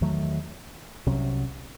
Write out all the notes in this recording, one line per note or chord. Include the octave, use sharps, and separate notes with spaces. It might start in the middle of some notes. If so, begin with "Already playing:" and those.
E2 D#3 F#3 A3
C2 C3 F#3 C#4